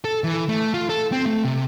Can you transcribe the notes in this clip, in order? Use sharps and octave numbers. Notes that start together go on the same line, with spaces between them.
A4
E3
A3
F4
A4
C4
A3
C3